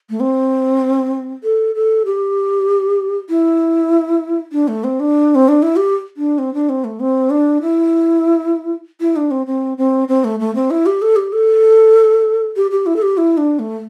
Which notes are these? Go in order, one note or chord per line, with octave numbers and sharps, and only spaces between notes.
A3
C4
A4
A4
G4
E4
D4
A3
C4
D4
C4
D4
E4
G4
D4
C4
D4
C4
A3
C4
D4
E4
E4
D4
C4
C4
C4
C4
A3
A3
C4
E4
G4
A4
G4
A4
G4
G4
E4
A4
G4
E4
D4
A3